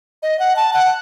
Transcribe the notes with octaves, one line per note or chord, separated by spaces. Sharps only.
D#5
F#5
A5
F#5